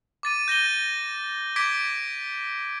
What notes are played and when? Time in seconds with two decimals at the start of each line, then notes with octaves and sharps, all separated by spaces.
0.23 D6 A6 D#7
0.48 G6 A#6 D#7 G7
1.56 D6 G#6 B6 D7